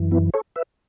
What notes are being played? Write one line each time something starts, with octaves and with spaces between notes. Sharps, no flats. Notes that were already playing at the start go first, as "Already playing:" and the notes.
Already playing: F#2 E3
B3 E4
A4 C#5
B4 E5